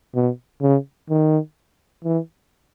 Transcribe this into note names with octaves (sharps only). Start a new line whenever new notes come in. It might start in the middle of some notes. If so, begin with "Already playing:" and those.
B2
C#3
D#3
E3